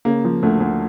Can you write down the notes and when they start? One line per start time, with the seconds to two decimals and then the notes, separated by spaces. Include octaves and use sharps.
0.05 C#3 A#3
0.25 F3
0.43 D2 A3
0.60 D2